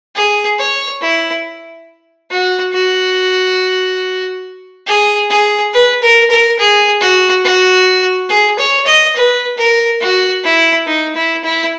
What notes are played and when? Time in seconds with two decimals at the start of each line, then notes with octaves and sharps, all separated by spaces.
0.16 G#4
0.59 C#5
1.02 E4
2.31 F#4
2.73 F#4
4.87 G#4
5.30 G#4
5.74 B4
6.02 A#4
6.30 A#4
6.59 G#4
7.01 F#4
7.45 F#4
8.30 G#4
8.59 C#5
8.87 D#5
9.16 B4
9.58 A#4
10.01 F#4
10.44 E4
10.87 D#4
11.16 E4
11.44 E4